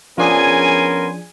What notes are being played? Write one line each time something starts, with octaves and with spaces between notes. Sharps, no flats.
F3 B3 C#4 D4 G#4 A#4 G#5 C6